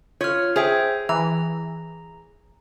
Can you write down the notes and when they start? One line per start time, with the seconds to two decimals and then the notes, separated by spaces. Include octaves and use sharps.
0.21 F4 C#5 F6
0.56 G#4 C5 E5 G5
1.09 E3 A#5